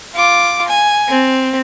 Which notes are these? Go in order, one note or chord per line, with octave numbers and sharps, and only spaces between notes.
F4 D6
G#5
C4